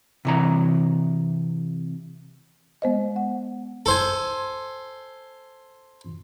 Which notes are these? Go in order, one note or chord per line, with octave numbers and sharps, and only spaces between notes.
C3 E3 A#5
G#3 B3 C5 D#5
F#5
A4 C5 G#5